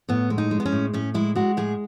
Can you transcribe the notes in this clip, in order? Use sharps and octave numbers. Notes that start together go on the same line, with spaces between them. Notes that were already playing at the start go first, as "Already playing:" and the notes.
A2 B3
G#3
D#4
G#3
B3
C#4
A2
A2 C#4
G#3 E4
G#3 F#4
A2 G#4